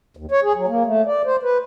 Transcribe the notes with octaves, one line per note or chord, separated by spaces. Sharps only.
D#2
C#5
G#4
F#3
A#3
A3
D5
C5
B4